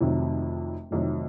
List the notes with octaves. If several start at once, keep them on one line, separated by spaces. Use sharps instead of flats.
F1 F2 C3 D#3 F#3
F1 F2 C3 D#3 F#3